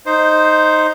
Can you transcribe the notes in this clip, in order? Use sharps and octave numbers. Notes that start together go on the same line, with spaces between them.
D#4 C5